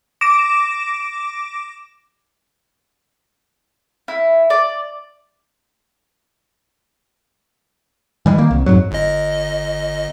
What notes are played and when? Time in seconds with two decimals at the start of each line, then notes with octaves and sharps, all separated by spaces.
0.21 D6 A#6 D7 E7
4.08 E4
4.50 D5
8.26 E3 G3 G#3
8.38 D#3 A#3
8.51 C2
8.66 F2 G#2 F#3
8.91 G1 D#5